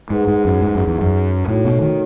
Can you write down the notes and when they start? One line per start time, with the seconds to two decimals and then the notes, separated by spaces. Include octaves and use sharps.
0.10 G#2 D#4 G#4 B4 F#5
0.27 G#2
0.45 F#2
0.62 G#2
0.75 F#2
0.87 E2
1.01 F#2
1.48 A2 A3 D#4 F#4 A4 C#5
1.65 B2
1.82 D#3